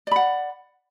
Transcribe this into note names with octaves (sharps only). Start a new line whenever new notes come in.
D5 F#5 B5